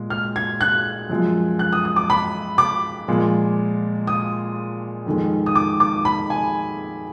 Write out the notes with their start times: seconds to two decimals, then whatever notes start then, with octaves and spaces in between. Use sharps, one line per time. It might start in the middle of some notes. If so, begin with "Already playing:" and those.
Already playing: A#2 G#3
0.10 F6
0.36 G#6
0.61 F#6
1.09 F#2 F3 G#3
1.59 F#6
1.73 D#6
1.85 D#6
1.96 D6
2.10 B5
2.58 D6
3.08 A#2 F3 G#3
4.07 D#6
5.06 F2 D#3 G#3
5.46 D#6
5.55 D6
5.80 D6
6.05 B5
6.30 G#5